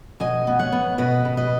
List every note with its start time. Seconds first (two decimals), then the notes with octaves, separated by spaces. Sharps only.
0.20 B2 D#5 G#5
0.47 B3
0.59 C#5 F#5
0.72 B3
0.98 B2 B4 D#5
1.25 B2
1.37 B4 D#5